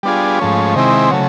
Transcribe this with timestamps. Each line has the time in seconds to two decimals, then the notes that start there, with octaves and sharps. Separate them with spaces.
0.03 G3 B3 D4 F4 G#4
0.39 G#2 F3 A3 C#4
0.75 C3 D#3 G#3 C4 E4
1.10 C#3 F#3 A3